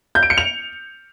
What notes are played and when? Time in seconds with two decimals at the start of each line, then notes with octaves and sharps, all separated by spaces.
0.15 G6
0.23 D7
0.30 C#7
0.38 F7